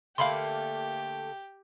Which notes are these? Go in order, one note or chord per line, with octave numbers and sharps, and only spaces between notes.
D3 A3 A#3 G4 F5 B5 C6